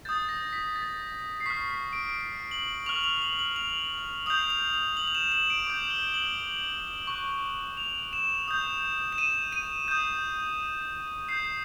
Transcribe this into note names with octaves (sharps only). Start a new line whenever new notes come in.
D#6 G6 A6
A#6
B6
A6
C7
C#6 F6 B6
D7
F#7
C#6 F6 F7
F7
F#7
F#7
F7
D#6 G6 F7
F7
F7
F#7
F7
E7
E7
D7
D6 G6 F7
G7
F#7
C#6 F#6
F7
E7
D#6 G6
E7
D#7
D#7
D#6 G6
D#6 G6 C7